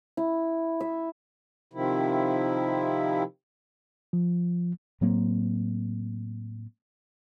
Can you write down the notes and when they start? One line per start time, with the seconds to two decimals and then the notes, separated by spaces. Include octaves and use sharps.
0.17 E4
0.80 E5
1.73 C3 D#3 F3 E4
4.13 F3
5.01 A2 F#3 A#3 C4